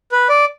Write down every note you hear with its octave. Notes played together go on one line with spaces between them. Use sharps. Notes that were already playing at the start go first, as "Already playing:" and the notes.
B4
D5